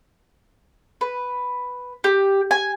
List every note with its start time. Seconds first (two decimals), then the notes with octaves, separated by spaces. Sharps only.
1.01 B4
2.04 G4
2.51 G#5